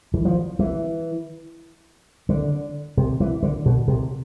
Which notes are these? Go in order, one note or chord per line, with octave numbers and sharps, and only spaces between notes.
E3
F3
E3
D3
C3
E3
D3
B2
C3